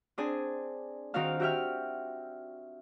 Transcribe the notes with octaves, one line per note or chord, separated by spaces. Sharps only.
C4 D4 G#4 G#5
D#3 C4 D#4 F#4 F5 F6
F#4 G4 E5 G5 F6